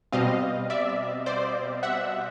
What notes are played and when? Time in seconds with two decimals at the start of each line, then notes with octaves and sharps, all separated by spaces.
0.12 B2 G3 C4 D#5 F5
0.70 D5 E5
1.26 C5 D5
1.83 E5 F#5